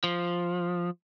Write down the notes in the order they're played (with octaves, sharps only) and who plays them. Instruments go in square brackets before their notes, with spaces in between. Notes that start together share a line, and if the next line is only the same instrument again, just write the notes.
[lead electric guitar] F3